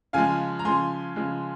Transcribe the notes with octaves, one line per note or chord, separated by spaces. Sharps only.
C#3 F3 G#3 F5 G#5
A#5
C#3 F3 G#3 G#5 C6
C#3 F3 G#3